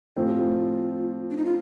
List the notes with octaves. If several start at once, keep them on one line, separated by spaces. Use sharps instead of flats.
A2 F3 C4 F4
G4
F4
D4
D#4
F4